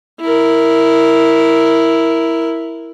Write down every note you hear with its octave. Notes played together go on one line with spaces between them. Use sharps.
E4 A#4